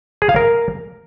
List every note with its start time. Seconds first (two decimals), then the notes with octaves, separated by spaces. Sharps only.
0.22 G#4
0.29 F5
0.36 A#4